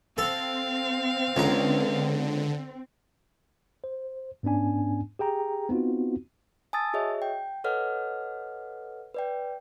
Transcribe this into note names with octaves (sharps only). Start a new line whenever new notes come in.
C4 A4 F5
C#2 D3 A#5
C5
G#2 B3 C#4 D4 G#5
G4 G#4 G5 A#5
B3 C4 D#4 F4 F#4
G#5 A5 D#6 E6 A6
F#4 G#4 C#5 D#5 E5
G5
A4 B4 C#5 D#5 F#5 F6
B4 D5 G5